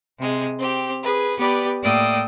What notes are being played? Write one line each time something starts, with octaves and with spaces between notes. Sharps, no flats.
C3 G#3
C4 G4
G#4 B4
B3 G4 B4 D5
A2 A#3 D5 G5 D#6 E6